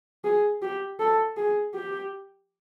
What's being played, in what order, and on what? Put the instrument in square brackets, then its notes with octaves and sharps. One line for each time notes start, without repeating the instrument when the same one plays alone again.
[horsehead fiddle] G#4
G4
A4
G#4
G4